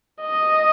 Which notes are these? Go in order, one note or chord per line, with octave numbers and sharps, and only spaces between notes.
D#5